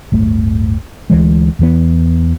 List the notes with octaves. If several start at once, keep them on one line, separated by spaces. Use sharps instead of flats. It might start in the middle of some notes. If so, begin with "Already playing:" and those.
D1 G1 A3
D2 E3 G#3
E2 E3 B3